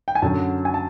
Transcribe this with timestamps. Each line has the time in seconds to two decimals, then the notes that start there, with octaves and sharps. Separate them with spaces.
0.08 G5
0.15 G#5
0.22 F#2 D3 F#3 A5
0.65 G#5
0.74 A5